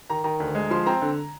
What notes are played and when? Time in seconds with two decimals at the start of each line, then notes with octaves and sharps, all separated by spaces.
0.10 D#3 A#5
0.24 D#3 A#5
0.40 D2
0.55 G#3
0.71 F3 C6
0.86 C4 A#5
1.02 D3